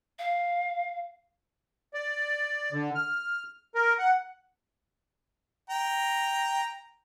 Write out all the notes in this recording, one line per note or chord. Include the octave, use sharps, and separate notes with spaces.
F5
D5
D3
F6
A#4
F#5
G5 A#5